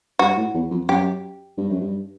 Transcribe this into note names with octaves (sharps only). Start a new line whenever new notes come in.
G2 F#4
A2
E2
F2
F#2 G4
G2
F#2
G2